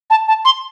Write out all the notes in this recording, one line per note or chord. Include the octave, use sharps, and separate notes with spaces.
A5
A5
C6